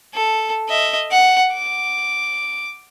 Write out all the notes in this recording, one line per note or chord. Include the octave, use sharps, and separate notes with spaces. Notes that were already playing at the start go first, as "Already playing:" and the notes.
A4
D#5 E5
F#5
D6